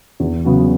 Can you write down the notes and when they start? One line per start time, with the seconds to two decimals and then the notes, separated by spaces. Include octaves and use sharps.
0.20 E2
0.45 C#3 F#3 B3 F#4